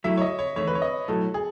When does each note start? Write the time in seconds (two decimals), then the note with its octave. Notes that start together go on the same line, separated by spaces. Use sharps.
0.04 F#3 A3 E4 E5
0.17 C#5
0.21 D#5
0.39 C#5
0.56 E2 D#3 A3 C#5
0.67 B4
0.75 C#5
0.82 D#5
1.08 B1 A2 F#3 A4
1.34 G#4